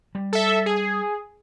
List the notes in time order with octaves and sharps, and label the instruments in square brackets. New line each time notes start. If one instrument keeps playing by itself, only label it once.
[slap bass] G3
[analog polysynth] A4 E5
G#4